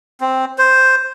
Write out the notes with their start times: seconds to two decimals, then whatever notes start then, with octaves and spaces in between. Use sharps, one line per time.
0.21 C4
0.58 C5